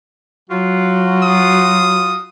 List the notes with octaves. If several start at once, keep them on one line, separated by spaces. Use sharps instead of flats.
F#3 F4 F#4
D#6